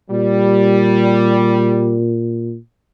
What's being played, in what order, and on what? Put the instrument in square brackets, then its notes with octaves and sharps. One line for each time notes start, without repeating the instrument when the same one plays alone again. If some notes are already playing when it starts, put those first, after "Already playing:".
[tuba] A#2 [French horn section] G3